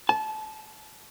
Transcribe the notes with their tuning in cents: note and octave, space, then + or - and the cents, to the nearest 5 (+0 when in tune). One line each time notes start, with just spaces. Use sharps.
A5 -25